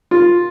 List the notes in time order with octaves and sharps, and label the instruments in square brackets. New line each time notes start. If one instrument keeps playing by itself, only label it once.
[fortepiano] F4